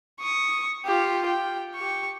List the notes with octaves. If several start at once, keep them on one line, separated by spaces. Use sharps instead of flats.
C#6 D#6
F4 G4
G5
G4 C#6